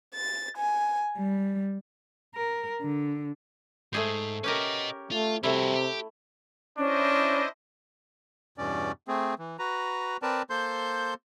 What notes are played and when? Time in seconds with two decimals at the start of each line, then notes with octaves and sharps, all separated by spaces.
0.15 A6
0.58 G#5
1.16 G3
2.35 A#4
2.81 D3
3.93 G#2 A3 G#4 C5
4.44 C#4 G4 A#4 B4 D#5
5.11 A3 F4
5.43 C3 G3 A3 E4 F#4
5.75 G4
6.78 C#4 D4 E4 C5 D#5
8.58 E2 G2 B2 C#4 D5
9.08 A3 C4 G#4
9.39 E3
9.59 F#4 B4 A#5
10.22 C4 A#4 B4 D5 A5
10.50 A#3 A4 C5 C6 G6